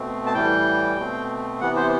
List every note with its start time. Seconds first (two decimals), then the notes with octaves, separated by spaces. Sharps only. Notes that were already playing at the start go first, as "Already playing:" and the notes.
Already playing: B2 A3 C4
0.26 A5
0.33 A2 E3 G3 G5
0.97 B2 A3 C4
1.61 C3 E3 B3 F#5
1.76 C5